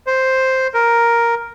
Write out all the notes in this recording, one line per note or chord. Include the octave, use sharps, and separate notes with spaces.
C5
A#4